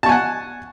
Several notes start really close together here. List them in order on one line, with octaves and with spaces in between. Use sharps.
A5 C#6 G#5 F#5